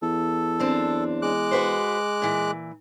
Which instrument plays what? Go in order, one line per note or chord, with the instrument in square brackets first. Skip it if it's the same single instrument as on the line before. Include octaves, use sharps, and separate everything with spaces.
[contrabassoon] E2 [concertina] A4
[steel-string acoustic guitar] F#2 C4 D4
[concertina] G#3 D6 F#6
[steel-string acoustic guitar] F#4 B4 C5
A#2 E3